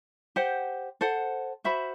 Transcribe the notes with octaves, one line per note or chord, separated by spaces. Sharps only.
G4 C5 F#5
A4 C5 F#5
F#4 C5 E5 B5